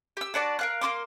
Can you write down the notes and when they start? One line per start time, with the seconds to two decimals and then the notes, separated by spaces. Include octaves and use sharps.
0.17 G4 E6
0.34 D4 F#4 D5 A5
0.59 A#4 F5 F#6
0.81 A#3 F#4 C6 D6